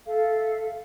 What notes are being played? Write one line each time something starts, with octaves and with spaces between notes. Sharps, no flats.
A4 E5 F5